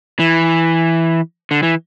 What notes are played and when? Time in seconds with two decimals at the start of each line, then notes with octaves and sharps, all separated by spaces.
0.19 E3
1.51 D3
1.63 E3